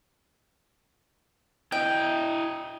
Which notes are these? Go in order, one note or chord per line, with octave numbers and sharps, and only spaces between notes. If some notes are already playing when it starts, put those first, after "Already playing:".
E4 D#5 G5